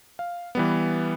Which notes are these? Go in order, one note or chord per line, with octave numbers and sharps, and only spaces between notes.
F5
E3 G3 B3